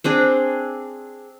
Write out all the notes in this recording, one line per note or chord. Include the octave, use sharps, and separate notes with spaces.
C4 D4 G#4